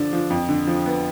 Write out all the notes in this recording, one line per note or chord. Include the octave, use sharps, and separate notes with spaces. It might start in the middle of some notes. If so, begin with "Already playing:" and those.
Already playing: D3 F3 D4
F3
F2
D3
F3
B3